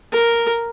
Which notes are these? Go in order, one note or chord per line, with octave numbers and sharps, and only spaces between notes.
A#4